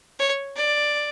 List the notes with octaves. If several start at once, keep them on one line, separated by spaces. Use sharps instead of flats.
C#5
D5